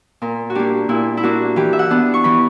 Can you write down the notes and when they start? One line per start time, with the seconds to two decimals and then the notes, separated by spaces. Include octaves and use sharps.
0.22 A#2 A#4
0.50 F#4
0.55 A#3 D4 G4
0.89 A#2 E4
1.17 E4
1.23 A#3 D4 F#4
1.56 E3 G4
1.73 E5
1.79 F#5
1.90 B3 D4
2.14 C#6
2.24 E3 B5